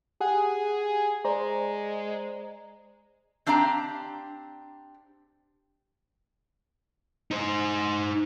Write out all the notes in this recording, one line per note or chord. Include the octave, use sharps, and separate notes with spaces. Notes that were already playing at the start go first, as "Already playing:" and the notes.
G4 G#4 F#5
G#3 C5 D5 A#5
C4 D4 G4 F5 A#5
D#4 C5